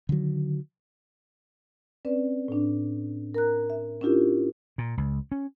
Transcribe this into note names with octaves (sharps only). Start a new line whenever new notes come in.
D3 D#3 F#3
C4 C#4 B4 D5
A2 D4
A#4 A#5 F#6
E5
C#4 D4 E4 F4 G4 A#4
A#2
C#2
C#4